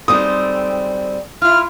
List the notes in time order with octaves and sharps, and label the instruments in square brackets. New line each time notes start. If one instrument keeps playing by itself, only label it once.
[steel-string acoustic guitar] G3 C4 [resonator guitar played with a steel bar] G#3 D#4 A4 [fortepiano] D#6
[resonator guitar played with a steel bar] E4 F4 [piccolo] F6